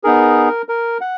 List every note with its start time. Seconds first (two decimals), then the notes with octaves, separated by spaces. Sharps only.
0.04 B3 D#4 G#4 A#4
0.69 A#4
1.01 F#5